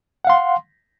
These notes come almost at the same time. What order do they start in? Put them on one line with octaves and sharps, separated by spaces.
F#5 F5 C6